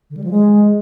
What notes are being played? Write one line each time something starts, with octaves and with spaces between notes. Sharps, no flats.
D3
G3
F3
G#3